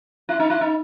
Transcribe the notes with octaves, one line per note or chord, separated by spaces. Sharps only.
E4
D#4
E4
D#4